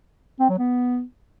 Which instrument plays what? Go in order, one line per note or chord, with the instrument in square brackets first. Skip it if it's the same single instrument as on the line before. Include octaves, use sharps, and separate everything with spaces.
[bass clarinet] C4
F#3
B3